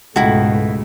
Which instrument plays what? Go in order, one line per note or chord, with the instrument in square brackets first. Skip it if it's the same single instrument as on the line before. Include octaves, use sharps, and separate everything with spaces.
[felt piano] C#2 [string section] G#2 B2 A3 [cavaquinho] E4 F#4